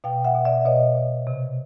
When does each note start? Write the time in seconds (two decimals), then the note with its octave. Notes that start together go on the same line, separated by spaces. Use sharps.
0.04 B2 F5 G5
0.25 E5 F#5
0.34 B2
0.45 D5 E5
0.65 B2 C#5 D#5
0.95 B2
1.27 C3